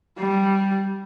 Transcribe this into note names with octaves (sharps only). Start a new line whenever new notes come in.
G3